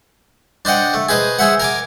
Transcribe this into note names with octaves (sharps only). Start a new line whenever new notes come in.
D4 C5 D#5 F#5 G5
A3
G#4 B4 C5 D#5
G#4 C5 E5 F#5
A#4 G#5 D6